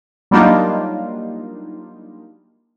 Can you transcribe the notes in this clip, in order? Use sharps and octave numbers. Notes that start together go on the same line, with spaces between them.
F#3 G3 A#3 D4 D#4 F4